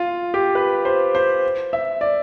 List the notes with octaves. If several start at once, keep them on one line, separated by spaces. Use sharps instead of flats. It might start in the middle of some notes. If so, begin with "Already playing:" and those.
Already playing: F4
G4
B4
C5
C5
E5
D5